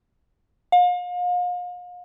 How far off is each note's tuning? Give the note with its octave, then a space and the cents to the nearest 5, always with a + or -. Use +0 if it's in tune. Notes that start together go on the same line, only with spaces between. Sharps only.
F5 +40